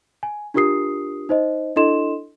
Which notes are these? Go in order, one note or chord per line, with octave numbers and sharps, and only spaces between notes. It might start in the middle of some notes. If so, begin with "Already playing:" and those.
G#5
D4 F4 G4 A#4 D#6 C7
D#4 C5 D#5
D4 E4 A4 D#5 C6 E7